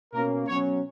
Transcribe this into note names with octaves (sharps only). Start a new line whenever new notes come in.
B2 A#3 C#4 A#4
B2 F#3 C#4 C#5